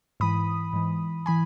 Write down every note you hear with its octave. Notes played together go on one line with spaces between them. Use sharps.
G#2 E3 B5 D#6
G#2 E3
E3 G#5 B5